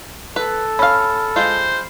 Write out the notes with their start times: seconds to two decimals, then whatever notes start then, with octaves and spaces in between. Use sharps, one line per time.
0.36 A4 B4
0.79 C#4 F5 B5 F6
1.36 G#3 F4 C5